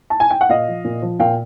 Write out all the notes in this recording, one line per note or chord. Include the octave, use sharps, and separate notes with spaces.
A5
G#5
G5
F#5
A#2 D#5 F5
F3
A#2
F3
A#2 F5 G5